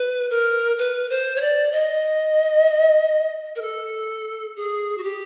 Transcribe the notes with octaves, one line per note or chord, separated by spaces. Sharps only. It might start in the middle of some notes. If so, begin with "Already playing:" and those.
Already playing: B4
A#4
B4
C5
C#5
D5
D#5
A#4
A4
G#4
F#4
G4